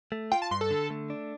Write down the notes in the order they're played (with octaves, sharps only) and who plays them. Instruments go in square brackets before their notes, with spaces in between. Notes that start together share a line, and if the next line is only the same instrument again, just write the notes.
[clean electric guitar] A3
[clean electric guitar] F4 [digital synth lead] G5
[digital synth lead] A5
[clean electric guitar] G2 [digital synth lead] C6
[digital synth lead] A4
[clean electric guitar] D3
A3
D4